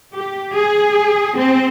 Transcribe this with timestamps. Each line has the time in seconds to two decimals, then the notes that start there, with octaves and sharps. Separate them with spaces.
0.16 G4
0.56 G#4
1.37 C4